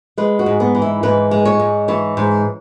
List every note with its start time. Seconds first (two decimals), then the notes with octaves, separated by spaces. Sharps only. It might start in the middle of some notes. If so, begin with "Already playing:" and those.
0.18 G#3 B4
0.39 F#4
0.46 G#2
0.60 B3
0.75 E3
0.82 E4
1.03 G#2 B4
1.31 G#3
1.46 C#5
1.60 G#2
1.88 E3 C#5
2.17 G#2